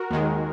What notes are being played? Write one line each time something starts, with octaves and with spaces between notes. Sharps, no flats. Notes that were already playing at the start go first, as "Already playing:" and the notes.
Already playing: F#4 A#4
D#2 D#3 G#3